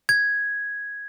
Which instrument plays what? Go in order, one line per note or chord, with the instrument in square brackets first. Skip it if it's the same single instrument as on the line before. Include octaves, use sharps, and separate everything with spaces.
[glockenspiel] G#6